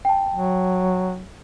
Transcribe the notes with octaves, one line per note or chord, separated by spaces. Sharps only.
G5 A5
F#3